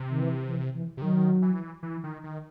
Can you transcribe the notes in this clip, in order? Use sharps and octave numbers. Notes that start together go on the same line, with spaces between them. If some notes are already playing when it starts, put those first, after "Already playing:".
Already playing: C3
D#3
E3
E3
E3
C3
D#3 F#3
E3
E3
D#3
D#3